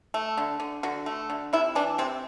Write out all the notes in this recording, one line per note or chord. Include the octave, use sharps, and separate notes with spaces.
A3
D3
D3
D3 F#4
A3
D3
C3 E4
E3 D4
C3 C4